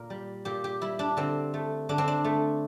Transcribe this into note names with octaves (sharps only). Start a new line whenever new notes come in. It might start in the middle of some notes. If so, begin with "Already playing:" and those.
Already playing: A#2 A#4
G3
A#2 G4
G4
G3 E4
D4
D3 C4
A3
D3 D4
C4
D4
A3